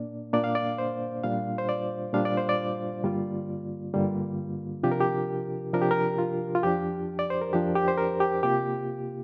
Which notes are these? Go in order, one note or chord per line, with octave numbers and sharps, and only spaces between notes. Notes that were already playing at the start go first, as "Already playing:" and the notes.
Already playing: A#2 A#3 D4 D5
A#2 A#3 D4 D5
F5
D5
C5
A#2 G3 D4 F4 F5
C5
D5
A#2 G3 D4 F4 F5
D5
C5
D5
G2 D3 G3 A#3 F4
G2 D3 G3 A#3 F4
C3 F3 D4 F4 G4
A#4
G4
C3 F3 D4 F4 A#4
G4
A#4
F4
F4
F2 F3 D4 G4
D5
C5
A#4
F2 F3 D4 G4
G4
C5
A#4
G4
C3 A#3 F4 G4